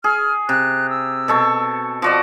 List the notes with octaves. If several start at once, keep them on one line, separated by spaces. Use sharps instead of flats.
G#4 F6
C3 F#6
E6
B2 A4 C#6
F3 F#4 D5 D#5